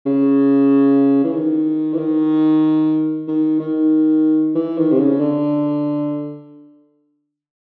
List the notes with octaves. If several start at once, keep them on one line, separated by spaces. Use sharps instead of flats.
C#3
E3
D#3
E3
D#3
D#3
D#3
E3
D#3
C3
C#3
D3